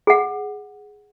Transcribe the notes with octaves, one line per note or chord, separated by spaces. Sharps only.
G#4 F#5